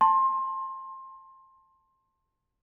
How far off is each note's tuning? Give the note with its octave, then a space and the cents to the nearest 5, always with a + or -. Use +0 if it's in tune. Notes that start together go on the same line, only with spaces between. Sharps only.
A5 +10 C6 +25